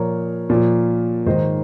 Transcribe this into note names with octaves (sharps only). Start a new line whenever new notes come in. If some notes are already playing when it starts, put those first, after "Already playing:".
Already playing: A#2 F3 A#4 C#5
A#2 F3
G#2 D#3 C5 D#5